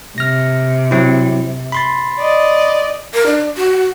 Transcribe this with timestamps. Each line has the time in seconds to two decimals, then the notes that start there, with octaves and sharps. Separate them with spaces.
0.18 C3 F6 A#6
0.91 F#3 C4 E4
1.72 B5 C6 A6
2.18 D5 D#5
3.14 A#4
3.26 D4
3.57 F#4